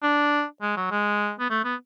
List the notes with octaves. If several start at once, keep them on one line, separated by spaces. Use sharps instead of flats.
D4
G#3
F#3
G#3
B3
A3
B3